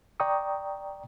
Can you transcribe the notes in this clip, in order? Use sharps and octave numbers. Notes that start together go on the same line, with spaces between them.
D5 G5 A#5 C#6 D#6